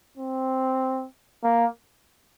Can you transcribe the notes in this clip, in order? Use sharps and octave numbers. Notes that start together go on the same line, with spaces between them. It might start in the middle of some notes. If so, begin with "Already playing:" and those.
C4
A#3